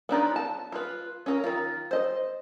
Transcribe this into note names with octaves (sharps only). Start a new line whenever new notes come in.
B3 D4 D#4 F4
A5
F4 B4
C#4 A#4
D#3 F4
C5 D#5